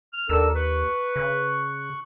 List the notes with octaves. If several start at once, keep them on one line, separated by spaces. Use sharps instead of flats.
F6
D#2 D4 A4 A#4 E6
B4 C#6 F#6
C#3